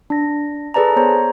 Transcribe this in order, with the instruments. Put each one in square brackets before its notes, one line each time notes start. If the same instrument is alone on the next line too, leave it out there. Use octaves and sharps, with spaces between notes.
[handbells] D4 A#6
G#4 A4 B4 D5 A5 A#5
B3 C5 C#5 A#5